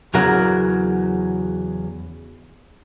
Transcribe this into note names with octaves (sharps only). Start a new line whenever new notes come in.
E2 C#3 F#3 A#4